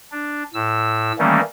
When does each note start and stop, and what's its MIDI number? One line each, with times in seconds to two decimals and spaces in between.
0.12 0.43 62
0.54 1.12 45
0.54 1.12 88
1.19 1.40 51
1.19 1.40 52
1.19 1.40 55
1.19 1.40 57
1.19 1.40 58
1.19 1.40 61